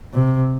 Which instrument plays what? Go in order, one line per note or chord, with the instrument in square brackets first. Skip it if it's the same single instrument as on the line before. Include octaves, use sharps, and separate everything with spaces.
[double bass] C3